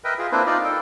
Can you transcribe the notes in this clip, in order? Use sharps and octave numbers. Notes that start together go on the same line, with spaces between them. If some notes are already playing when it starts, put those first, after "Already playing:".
A#4 B4 D#5 E5 G5
F4 G#4
A#3 C4 D4 E4 B4 C5
D#4 F4 D5
A4 G5